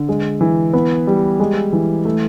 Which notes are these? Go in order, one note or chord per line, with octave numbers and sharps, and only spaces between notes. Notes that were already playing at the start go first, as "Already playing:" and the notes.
Already playing: D3
G#3
E3
B3
G3
G#3
E3
A3